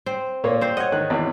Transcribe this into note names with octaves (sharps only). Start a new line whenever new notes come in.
C4
A#2 A#3 C#5
C4 C5
C#5 D#5 F#5
G#2 D#3 F#6
G#1 E2